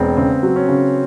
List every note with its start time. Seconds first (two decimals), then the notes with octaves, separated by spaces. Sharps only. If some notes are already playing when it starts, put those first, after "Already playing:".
Already playing: E1 B3 C4
0.17 C#3 C4
0.43 F#3
0.56 C#4
0.68 C#3